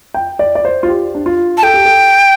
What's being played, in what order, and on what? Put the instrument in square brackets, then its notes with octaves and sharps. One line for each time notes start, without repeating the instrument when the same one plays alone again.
[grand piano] G5
D5
D5
C5
F4
G4
D4
F4
[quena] A5
[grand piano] A4 [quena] G5
[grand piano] G4
A4